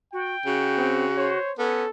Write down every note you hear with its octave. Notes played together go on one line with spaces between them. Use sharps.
F#4 G5
C#3 F#4
C4
C5 C#5
B3 C#4 A4